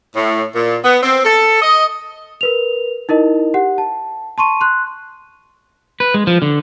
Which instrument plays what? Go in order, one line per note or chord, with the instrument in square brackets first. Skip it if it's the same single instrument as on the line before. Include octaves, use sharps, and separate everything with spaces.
[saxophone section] A2
A#2
B3
C4
A4
D#5
[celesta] A#4 B4 F7
D#4 E4 A#4 D#5
G4 F#5
A5
A5 C6 C#6 D#7
C6 F#6
[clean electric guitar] B4
G#3
F3
D3